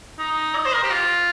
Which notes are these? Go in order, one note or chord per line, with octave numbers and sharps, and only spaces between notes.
D#4
D#5
C5
A#4
G4
F4